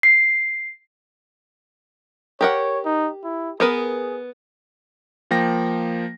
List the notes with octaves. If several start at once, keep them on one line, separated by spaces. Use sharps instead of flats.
C7
G4 A#4 C#5 F#5
D#4
E4
B3 G#4 A#4 B4
F3 A#3 G5 A#6